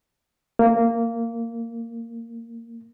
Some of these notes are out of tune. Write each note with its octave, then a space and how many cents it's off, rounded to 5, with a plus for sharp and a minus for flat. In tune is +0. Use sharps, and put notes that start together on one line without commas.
A#3 -15